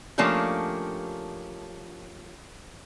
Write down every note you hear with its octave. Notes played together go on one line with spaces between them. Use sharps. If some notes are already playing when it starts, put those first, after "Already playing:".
F3 A3 A#3 C#4 D4 G4